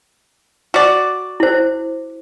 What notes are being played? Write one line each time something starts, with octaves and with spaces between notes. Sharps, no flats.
F#4 D5
E4 C5